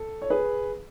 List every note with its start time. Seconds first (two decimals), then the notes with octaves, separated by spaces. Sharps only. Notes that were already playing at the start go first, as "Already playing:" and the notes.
Already playing: A4
0.22 C#5
0.30 G#4 B4